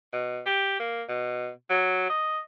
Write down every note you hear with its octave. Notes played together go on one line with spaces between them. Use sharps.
B2
G4
A#3
B2
F#3
D#5